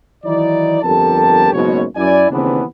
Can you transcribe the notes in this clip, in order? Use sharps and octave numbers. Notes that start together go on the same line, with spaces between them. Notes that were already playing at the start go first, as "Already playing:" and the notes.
D#3 E3 F#3 D#4 E4 D5
G1 F2 G4 A4 A#4 A5
F#1 G#2 B2 C#5
F#2 E4 D5 G#5
D#2 C#3 E3 B3 C4 D4